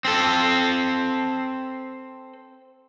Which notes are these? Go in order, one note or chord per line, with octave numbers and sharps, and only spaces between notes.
C4 A4